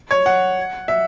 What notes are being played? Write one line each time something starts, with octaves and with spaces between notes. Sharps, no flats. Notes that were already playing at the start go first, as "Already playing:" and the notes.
C#5
F#5
E5